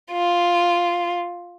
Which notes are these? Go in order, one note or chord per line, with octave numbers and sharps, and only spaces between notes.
F4